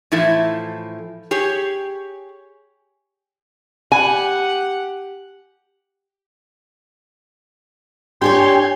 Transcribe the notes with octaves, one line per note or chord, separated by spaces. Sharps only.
A2 E3 F3 E4 A4
G4 G#4 C#5
G4 F#5 G#5
D4 G4 A4 C#5 G5 G#5 C6